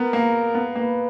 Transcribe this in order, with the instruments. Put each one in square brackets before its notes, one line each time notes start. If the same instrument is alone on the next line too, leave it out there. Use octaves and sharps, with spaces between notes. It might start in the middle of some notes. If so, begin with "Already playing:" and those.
Already playing: [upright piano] B3 [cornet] A#4
[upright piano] A#3
B3
[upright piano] A#3 [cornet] B4